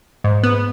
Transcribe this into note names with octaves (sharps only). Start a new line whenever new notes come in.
G#2
B3